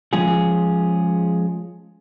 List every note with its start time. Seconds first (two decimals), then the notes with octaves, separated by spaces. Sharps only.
0.13 F3 G#3 C#4 F4 G#4